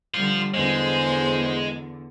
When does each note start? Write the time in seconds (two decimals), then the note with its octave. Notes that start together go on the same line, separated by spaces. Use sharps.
0.14 D3 G3 F4 C5
0.54 E2 D3 G#3 C5